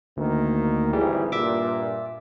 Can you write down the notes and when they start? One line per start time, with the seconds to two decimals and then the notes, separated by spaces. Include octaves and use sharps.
0.17 D2 D#3 A#3
0.93 G#1 E3 G3 G#4
1.32 G2 A#2 E5 D6